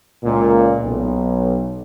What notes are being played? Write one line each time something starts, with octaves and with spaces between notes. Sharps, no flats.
C#2 A#2
B1